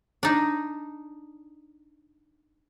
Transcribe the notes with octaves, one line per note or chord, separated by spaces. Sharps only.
D4 D#4